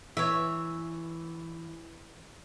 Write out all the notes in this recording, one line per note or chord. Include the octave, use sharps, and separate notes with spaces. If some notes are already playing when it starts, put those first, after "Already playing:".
E3 C#5 E5